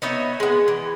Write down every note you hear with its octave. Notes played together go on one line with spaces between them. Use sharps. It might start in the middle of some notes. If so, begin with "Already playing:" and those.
B3 D#4 C#5 E5
G#3 B3
E3